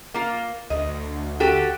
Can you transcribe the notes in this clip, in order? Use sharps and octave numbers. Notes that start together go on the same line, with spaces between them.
A#3 F4
D2 D#5
F#4 G4 A4